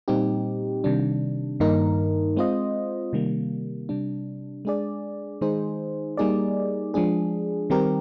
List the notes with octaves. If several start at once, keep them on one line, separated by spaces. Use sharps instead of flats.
A#2 G3 C4 D#4 G4
C3 D#3 G3 D4
G2 D#3 A#3 D#4 A#4
G#3 C4 F4 C5 D#5
C3 D#3 G3 A#3
C3 G3 D4
G#3 D4 G#4 D5
D#3 G#3 D#4 G#4 C5
G3 A#3 D#4 G#4 D5
F3 G#3 D4 G#4
D#3 G3 C4 G4 A#4